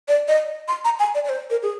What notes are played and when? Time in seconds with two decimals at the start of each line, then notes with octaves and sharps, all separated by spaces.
0.08 D5
0.28 D#5
0.68 C6
0.85 A#5
1.00 G#5
1.15 D5
1.25 D5
1.29 C5
1.50 A#4
1.63 G#4